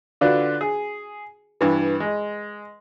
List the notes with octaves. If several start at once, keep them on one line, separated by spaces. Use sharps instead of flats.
D3 D4 F4 F#4 B4
G#4
G2 E3
G#3